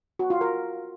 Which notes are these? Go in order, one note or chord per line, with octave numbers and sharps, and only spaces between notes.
F#4
F4
A#4